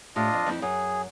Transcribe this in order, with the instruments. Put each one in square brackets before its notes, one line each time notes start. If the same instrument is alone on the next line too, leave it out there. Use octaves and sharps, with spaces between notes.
[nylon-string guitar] A2 G4 [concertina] D4 F4 D#5
[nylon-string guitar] F2
F2 C4 E4
[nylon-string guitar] F#2 [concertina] G#4